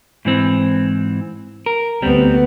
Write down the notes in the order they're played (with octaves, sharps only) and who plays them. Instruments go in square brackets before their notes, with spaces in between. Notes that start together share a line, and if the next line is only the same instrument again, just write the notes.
[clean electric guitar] G#2 E3 C4
A#4
[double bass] D2 B3 [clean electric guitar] G3 C4